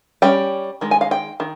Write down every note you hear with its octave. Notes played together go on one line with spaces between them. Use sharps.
G3 C#4 G5
D#3 G#3
G#5
F5
G5
D#3